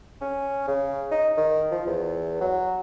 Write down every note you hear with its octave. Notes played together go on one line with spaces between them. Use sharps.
C#4
C#3
D#4
D#3
F3
E2
F#3